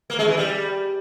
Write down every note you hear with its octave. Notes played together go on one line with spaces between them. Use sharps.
A#3
G#3
E3
G3